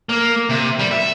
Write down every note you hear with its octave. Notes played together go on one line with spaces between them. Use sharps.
A#3
C3
G3
E5